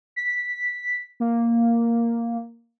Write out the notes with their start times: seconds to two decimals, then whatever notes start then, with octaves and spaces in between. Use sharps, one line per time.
0.16 B6
1.20 A#3